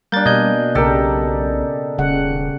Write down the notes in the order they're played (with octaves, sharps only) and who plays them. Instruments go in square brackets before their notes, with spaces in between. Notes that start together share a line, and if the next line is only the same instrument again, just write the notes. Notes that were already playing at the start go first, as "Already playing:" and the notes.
[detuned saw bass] G3 [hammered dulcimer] A#3 D4 [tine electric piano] G6 A6
[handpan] B2 [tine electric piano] D#5 G6 [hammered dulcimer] G#5
[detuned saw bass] B1 [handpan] C#3 A#4 [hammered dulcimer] G4 A4 D5
[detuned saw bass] D#1 [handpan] C#3 F#5